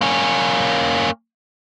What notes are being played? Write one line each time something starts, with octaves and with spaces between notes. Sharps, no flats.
A#3 C#4